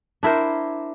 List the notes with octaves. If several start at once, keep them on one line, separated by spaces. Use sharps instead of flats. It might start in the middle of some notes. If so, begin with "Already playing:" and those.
D4 E4 A#4 C5